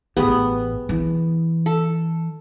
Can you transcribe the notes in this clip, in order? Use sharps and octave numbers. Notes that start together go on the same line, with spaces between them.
A1 A2 B3 G4 G#4 B4
E3
A4